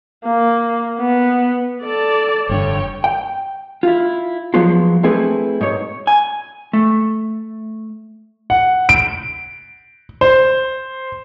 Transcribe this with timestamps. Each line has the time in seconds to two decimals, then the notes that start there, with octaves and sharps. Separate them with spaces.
0.25 A#3
1.00 B3
1.84 A4 D5 A5
2.49 F1 G2 D3 C#5 G5
3.04 G5
3.83 E4 F4
4.54 F3 F#3 G#3 B3 F4
5.03 A3 C4 E4 G#4 A4 B4
5.61 G#2 C#5
6.07 G#5
6.73 A3
8.50 F#5
8.89 D7
10.21 C5